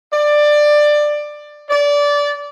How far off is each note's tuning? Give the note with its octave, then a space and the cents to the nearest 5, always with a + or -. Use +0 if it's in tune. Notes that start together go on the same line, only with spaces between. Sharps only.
D5 +15
D5 -20